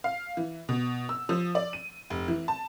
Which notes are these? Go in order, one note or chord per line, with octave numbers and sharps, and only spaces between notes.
F5
E3
B2
E6
F3
D5
D#7
F1
E3
A5